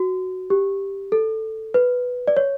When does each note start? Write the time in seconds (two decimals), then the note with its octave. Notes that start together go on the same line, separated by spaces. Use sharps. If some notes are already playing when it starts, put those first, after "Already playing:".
Already playing: F#4
0.50 G4
1.12 A4
1.74 B4
2.28 D5
2.37 C#5